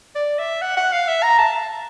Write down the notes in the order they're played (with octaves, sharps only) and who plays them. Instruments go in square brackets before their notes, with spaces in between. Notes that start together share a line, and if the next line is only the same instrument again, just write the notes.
[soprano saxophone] D5
E5
F#5
F#5
F5
E5
A#5
A5